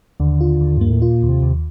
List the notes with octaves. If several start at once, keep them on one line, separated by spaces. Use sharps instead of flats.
D#2 D3
F4
D#2
G2 A#3
A2
A#2 F4
D#2
C3
D#2